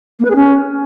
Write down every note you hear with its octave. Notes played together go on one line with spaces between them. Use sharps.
A#3
B4
G#4
C#4